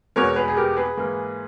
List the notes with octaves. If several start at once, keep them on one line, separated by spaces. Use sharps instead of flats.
E2 B2 G#3 B3 A#4 C#5
G#4 B4
G#4
G4 A#4
G#4 B4
G#2 E3 A#3